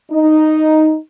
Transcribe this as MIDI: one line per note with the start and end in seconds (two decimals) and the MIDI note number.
0.11 0.96 63